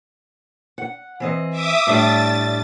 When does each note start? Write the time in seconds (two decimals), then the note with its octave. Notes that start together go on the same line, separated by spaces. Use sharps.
0.78 F#5
1.20 E3 C4 D#5
1.50 E5 D6 D#6
1.87 A2 G3 D4 A6